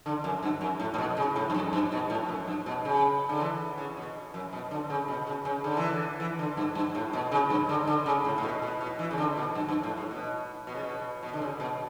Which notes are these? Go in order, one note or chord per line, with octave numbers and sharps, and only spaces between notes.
D3
F#2
G2
F#2
A2
A2
B2
C#3
A2
G2
F#2
G2
B2
A2
F#2
G2
B2
C#3
D3
E3
C#3
B2
F#2
B2
D3
C#3
B2
C#3
C#3
D3
E3
D3
E3
D3
G2
G2
A2
B2
C#3
G2
D3
D3
C#3
A2
A2
B2
B2
B2
E3
C#3
D3
B2
G2
G2
A2
A2
B2
B2
C#3
B2
B2
D3
C#3
B2